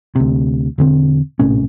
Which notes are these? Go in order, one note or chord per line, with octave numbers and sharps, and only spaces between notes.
D2 C3
E1 D3 C4
A#1 A2 C3 C#4